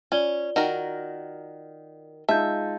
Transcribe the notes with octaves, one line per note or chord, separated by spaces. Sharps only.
C#4 F4 D5 G7
D#3 F#4 A#4
G#3 D#4 F4 E5 A5 G6